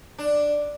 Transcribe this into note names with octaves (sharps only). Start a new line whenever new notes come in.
D4